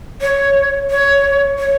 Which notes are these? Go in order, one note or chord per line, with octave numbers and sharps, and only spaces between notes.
C#5
C#5
C#5